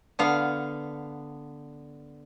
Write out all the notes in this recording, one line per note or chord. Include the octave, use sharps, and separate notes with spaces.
D3 B3 F5